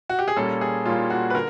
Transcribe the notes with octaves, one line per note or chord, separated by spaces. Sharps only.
F#4
G4
G#4
A#2 G3 A#3 C#4 A4
G#4
A#2 G3 A#3 C#4 F4
F#4
B4
D3 A#4